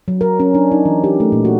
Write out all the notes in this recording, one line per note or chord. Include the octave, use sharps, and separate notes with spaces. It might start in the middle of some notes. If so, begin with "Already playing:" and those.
F#3
A#4
C#4
D4
D#4
E3
G4
A3
A#2
F#4